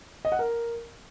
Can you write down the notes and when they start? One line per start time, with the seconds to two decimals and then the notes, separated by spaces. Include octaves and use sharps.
0.25 D#5
0.32 F#5
0.39 A#4